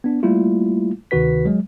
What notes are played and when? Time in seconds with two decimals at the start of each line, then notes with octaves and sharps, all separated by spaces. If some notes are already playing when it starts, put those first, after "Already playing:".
0.04 B3 D4
0.23 G3 A3 A#3 E4 F4
1.11 D2 C3 D#3 F#4 B4 B6
1.45 F#3 G#3